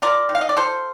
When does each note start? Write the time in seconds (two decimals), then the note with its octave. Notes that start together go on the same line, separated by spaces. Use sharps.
0.02 F4 A#4 D5
0.29 D#3
0.35 F5
0.41 D#5
0.49 D5
0.57 F4 A4 C5